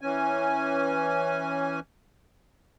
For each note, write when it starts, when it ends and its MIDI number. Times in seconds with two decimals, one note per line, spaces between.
0.01 1.80 52
0.01 1.80 61
0.01 1.80 80